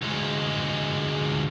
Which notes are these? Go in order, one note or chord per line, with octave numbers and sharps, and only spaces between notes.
D2 G#3